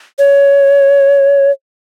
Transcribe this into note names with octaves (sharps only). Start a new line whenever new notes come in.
C#5